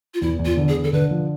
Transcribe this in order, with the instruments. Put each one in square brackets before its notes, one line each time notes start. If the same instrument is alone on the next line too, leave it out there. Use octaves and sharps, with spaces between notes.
[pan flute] F4
[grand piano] E2 [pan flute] E4
[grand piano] E2
[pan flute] F4
[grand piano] D3
[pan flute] G#4
[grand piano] D3
[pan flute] A4
[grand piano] D3 [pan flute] B4
[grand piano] F3